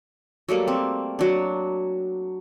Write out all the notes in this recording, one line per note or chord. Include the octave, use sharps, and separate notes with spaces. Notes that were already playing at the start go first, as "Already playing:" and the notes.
F#3 G3 A3 A#3
C4
F#3 D4